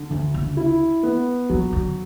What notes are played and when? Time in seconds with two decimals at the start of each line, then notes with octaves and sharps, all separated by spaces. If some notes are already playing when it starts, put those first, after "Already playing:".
Already playing: D3
0.10 D2 C#3
0.34 C#3
0.57 E4
1.03 B3
1.49 B2 F#3
1.73 D3